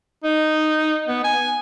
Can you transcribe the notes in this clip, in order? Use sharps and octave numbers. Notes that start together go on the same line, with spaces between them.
D#4
B3
G#5